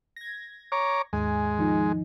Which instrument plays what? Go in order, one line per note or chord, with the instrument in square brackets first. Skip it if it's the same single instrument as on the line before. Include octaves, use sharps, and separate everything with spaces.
[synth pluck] G#6 A#6
[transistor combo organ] C#5 A#5 D6
[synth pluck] D#2 G#2 G#5 [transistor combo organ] G#3
[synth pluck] D#3 F3 D#4